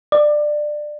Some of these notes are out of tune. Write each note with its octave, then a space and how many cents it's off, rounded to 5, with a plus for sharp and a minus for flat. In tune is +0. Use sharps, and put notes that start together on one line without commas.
D5 +20